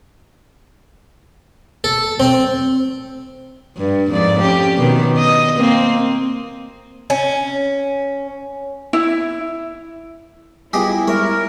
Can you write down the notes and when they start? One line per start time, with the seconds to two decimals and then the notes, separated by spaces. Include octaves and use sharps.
1.84 A4
2.20 C4
3.76 G2
4.09 F2 G#2 D5
4.40 C#4 G4
4.77 B2 D#3
5.18 D#5
5.58 A#3 C4
7.10 C#4
8.93 E4
10.73 G3 B3 E4 F4 G4 G#4 D#5
11.08 G3 G#3 A#4 C#5 E5